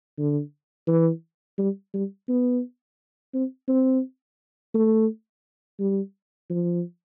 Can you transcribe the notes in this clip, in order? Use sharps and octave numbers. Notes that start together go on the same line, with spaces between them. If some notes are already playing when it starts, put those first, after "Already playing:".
D3
E3
G3
G3
B3
C4
C4
A3
G3
F3